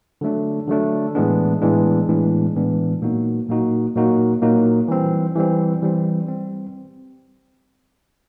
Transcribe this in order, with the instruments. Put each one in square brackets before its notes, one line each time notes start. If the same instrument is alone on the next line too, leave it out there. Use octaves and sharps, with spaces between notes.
[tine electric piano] D3 F#3 A3 D4
D3 F#3 A3 D4
A2 E3 G#3 B3 D4
A2 E3 G#3 B3 D4
A2 E3 G#3 B3 D4
A2 E3 G#3 B3 D4
A#2 F#3 A#3 D#4 F#4
A#2 F#3 A#3 D#4 F#4
A#2 F#3 A#3 D#4 F#4
A#2 F#3 A#3 D#4 F#4
E3 G3 C4
E3 G3 C4
E3 G3 C4
G3 C4